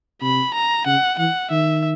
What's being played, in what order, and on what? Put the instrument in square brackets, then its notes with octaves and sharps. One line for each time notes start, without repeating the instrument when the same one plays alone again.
[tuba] C3 [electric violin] B5
[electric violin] A#5
[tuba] C#3 [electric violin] F#5
[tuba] E3 [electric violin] F#5
[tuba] D#3 [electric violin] E5